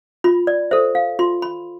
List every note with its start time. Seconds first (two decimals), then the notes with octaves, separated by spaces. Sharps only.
0.24 F4 B5
0.47 D5
0.71 A4 C5 E5
0.95 F5
1.19 F4 C6
1.42 B5